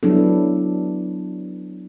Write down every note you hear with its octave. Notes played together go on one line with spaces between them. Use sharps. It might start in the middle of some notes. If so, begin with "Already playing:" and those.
F#3 B3 D4 E4 A4